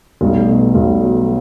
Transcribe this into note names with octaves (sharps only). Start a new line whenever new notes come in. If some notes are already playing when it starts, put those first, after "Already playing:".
B1 G3
A3
G3
B2
B1 G3
B2 F#3